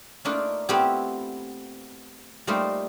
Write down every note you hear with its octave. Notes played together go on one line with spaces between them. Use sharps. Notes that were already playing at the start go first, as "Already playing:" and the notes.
A3 A#3 D4 D#4 F4
A3 B3 C4 E4 F4 G4
G3 A3 A#3 D#4 F4 C5